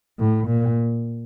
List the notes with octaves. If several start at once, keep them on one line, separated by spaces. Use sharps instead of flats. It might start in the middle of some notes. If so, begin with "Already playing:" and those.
A2
A#2